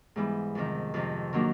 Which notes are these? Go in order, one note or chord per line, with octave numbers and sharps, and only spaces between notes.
G#2 E3 G3 B3
F2 C3 D#3
F2 C3 D#3
D#3 F#3 A#3 D4